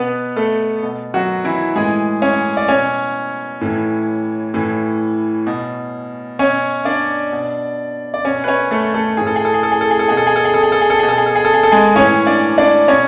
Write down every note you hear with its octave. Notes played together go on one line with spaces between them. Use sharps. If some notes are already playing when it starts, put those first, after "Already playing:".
Already playing: B2 B3 B4
A3 A4
B2
F#3 F#4
E3 E4
A2 E3 G#3 G#4
C#4 C#5
D5
B2 C#4 C#5
A2 E3
A2 E3
B2
B2 C#4 C#5
D4 D5
B2
D5
B2 C#4 C#5
B4
C#4 C#5
A3 A4
A3 A4
A2 E3 G#4
A4
G#4
A4
G#4
A4
G#4
A4
G#4
A4
B2 G#4
A4
G#4
A4
G#4
A4
G#4
A4
G#4
A4
B2 G#4
A4
G#4
A4
G#4
A4
G#4
A4
G#3 G#4
A2 E3 C#4 C#5
D4 D5
D4 D5
B2 C#4 C#5